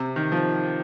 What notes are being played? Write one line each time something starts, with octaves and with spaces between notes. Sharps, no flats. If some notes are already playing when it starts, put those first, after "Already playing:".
Already playing: C3
D#3
F3